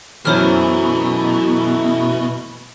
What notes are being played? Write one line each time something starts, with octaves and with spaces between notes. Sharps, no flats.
F#2 B2 E3 A3 E4 C5 C#5 F6